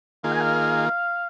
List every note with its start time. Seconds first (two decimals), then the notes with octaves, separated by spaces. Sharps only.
0.24 D#3 A#3 F4 G#4 F5
0.32 G#5
0.41 F5